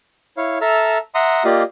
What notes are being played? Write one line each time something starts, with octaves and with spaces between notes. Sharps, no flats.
E4 C#5 F5
A4 E5 A5 A#5 E6 F6
E5 F#5 A#5 C6 D#6
A#3 F4 G4 D5 D#5 F5